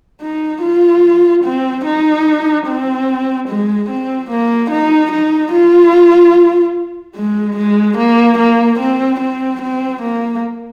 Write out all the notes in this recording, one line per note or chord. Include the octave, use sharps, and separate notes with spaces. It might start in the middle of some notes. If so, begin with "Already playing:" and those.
D#4
F4
C4
D#4
C4
G#3
C4
A#3
D#4
D#4
F4
G#3
G#3
A#3
A#3
C4
C4
C4
A#3